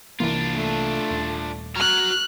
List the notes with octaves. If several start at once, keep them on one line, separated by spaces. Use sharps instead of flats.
C2 E3 A#3 D4 F4
A3
D#1
F#4 A#5 F6 F#6